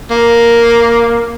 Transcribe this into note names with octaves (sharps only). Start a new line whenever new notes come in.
A#3